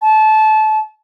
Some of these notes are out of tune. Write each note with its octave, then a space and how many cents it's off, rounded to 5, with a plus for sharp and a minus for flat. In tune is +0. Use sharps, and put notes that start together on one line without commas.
A5 -25